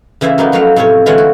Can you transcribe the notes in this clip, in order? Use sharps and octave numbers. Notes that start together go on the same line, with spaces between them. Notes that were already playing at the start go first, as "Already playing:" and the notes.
C#3 E3 E4 C5 E5
F#3 A#3 B3 D#4
F3 F#3 A3 B4 F5
A2 C3 C4 F4 C#5
D3 E3 G#3 F4 C#5 F#5
F#4